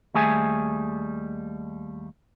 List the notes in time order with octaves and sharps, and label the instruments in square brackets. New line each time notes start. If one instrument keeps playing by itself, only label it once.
[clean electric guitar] D#2 G3 A3 G#4 E5 G#5